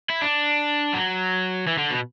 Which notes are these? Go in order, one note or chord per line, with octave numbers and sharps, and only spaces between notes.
E4
D4
F#3
E3
D3
B2